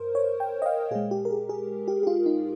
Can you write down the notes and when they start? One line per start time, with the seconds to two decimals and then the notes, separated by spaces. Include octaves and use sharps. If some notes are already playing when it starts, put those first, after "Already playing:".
Already playing: G2 A#4 C5
0.15 C#5
0.40 G5
0.62 D#5
0.66 F5
0.91 A#2 G#3 G#4
1.11 G4
1.25 A#4
1.30 G#4
1.49 G#4
1.88 G4
2.03 G4
2.07 F4
2.26 D#4